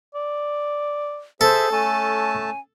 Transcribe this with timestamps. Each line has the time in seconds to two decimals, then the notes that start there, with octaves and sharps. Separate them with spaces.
0.15 D5
1.41 G#4 A4 C5 E5
1.72 A3 C#4 G#5 A5